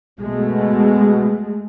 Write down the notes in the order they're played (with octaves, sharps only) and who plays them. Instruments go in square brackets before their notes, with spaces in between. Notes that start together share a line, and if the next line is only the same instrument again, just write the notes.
[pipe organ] B2 [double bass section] G#3 A3